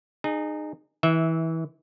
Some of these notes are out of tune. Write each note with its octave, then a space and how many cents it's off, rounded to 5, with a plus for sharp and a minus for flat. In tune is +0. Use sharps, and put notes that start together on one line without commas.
D#4 -30 G#4 +0
E3 -25 E5 -10